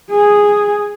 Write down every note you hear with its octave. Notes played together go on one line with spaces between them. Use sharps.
G#4